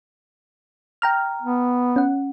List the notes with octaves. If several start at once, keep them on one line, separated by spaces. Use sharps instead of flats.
G5 A#5 F6
B3
C#4 F#5